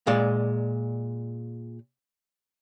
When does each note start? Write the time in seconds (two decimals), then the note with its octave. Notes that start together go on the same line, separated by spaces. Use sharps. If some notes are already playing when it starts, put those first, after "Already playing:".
0.07 A#2 G#3 D5